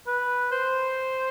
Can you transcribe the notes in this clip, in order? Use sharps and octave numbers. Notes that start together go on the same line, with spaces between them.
B4
C5